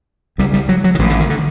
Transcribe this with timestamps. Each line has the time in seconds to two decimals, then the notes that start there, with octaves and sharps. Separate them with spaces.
0.38 C#2 C#3 G3
0.54 G3
0.69 F#3
0.84 F#3
0.95 D#3
0.99 A1 A2 E3
1.10 D3
1.20 D#3
1.30 D3